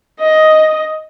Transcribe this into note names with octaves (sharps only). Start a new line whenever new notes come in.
D#5